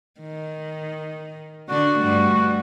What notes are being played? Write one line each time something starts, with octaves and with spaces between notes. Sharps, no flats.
D#3
D3 D4 F#4
G2 G3 A3